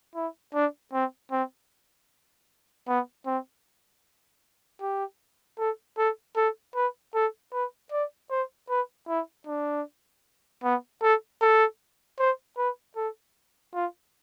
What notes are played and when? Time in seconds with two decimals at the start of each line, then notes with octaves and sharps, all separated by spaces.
0.15 E4
0.54 D4
0.93 C4
1.31 C4
2.88 B3
3.26 C4
4.81 G4
5.59 A4
5.98 A4
6.37 A4
6.75 B4
7.15 A4
7.53 B4
7.92 D5
8.30 C5
8.69 B4
9.08 E4
9.47 D4
10.63 B3
11.02 A4
11.41 A4
12.19 C5
12.57 B4
12.96 A4
13.74 F4